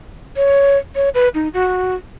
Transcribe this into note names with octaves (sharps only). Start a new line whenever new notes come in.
C#5
C#5
B4
D#4
F#4